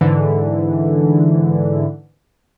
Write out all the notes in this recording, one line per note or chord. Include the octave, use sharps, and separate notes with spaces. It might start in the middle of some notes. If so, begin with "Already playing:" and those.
G#2 D3 E3